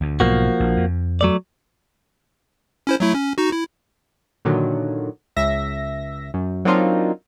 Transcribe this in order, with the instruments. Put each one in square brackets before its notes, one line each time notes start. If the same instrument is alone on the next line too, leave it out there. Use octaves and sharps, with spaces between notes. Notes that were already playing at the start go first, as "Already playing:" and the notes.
[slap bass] D2
[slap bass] B1 G#2 [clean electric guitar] F3 A#3 F#4
[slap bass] A#1
F2
[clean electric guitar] F#3 A3 D5
[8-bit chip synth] C#4 E4 C5
F#3 A3 E4
C#4
D#4 F#4
E4
[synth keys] A#2 D3 D#3 F#3
C#2 E5 A#6
F#2
F#3 A#3 C4 D4 D#4 F4